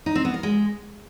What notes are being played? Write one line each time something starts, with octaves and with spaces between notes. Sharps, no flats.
D#4
C4
B3
A#4
G#3